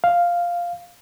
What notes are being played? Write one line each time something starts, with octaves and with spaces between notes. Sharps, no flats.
F5